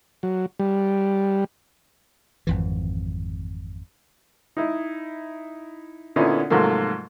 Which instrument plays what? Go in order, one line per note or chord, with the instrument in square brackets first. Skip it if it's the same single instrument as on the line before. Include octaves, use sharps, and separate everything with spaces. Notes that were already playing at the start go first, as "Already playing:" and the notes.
[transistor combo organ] F#3
G3
[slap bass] G#1 F2 E3
[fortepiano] D#4 E4
A#2 D3 B3 C#4 D#4 E4
G#2 C3 F3 F#3 A3 A#3